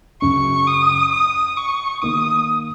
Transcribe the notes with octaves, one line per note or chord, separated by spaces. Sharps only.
F#2 C#3 F#3 C#4 C#6
D#6
D#6
C#6
D#3 A#3 D#4 D#6